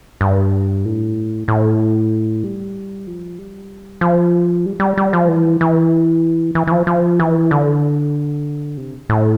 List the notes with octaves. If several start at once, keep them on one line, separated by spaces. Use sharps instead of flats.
G2
A2
A2
G3
F3
G3
F3
G3
G3
G3
F3
E3
E3
E3
E3
F3
F3
E3
D3
C3
A2